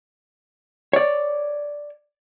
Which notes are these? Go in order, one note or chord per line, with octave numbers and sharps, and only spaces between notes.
C#5 D5